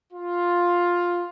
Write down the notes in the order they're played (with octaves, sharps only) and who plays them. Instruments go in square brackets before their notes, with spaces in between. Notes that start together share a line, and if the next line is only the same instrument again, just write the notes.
[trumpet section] F4